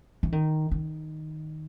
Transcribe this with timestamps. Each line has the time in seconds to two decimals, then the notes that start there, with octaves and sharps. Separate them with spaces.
0.23 E3
0.32 D#3
0.71 D#3